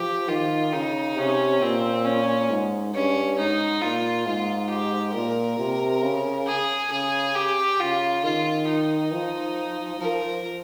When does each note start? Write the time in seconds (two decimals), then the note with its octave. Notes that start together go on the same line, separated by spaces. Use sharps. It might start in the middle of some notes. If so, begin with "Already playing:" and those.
Already playing: F3 G4
0.28 D#3 F4
0.73 C#3 D#4
1.17 C3 C#4
1.61 A#2 C4
2.05 C#4
2.50 G#2
2.94 G2 C#4
3.38 G#2 D#4
3.82 A#2 F4
4.26 G#2 F4
4.70 G4
5.14 A#2 A#4
5.58 C3
6.02 C#3
6.47 G#4
6.91 C#3 G#4
7.35 G4
7.80 C#3 F4
8.24 D#3 F4
8.69 D#4
9.12 F3
10.00 F3 A#4